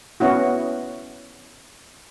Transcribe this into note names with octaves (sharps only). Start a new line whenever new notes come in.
B3 C#4 E4 F#4